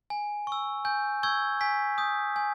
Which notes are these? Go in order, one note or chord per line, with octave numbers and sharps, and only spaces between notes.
G#5
C#6 E6
G#5 G6
C#6 E6 G6 G#6
G#5 B6
D#6 G6
G#5